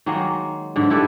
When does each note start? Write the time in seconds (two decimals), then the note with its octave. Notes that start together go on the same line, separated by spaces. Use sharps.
0.06 D#3 F#3 G#3 A#3
0.76 G#2 D3
0.90 E4 G4 A4 B4